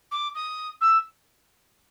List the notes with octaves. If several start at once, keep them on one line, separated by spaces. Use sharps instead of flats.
D6
D#6
E6